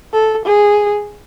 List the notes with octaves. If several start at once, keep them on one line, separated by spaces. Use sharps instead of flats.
A4
G#4